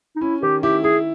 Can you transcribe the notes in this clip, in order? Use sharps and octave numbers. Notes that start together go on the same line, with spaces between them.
D#4
C#4 E4
D#3 G4
E4 G4
E4 G#4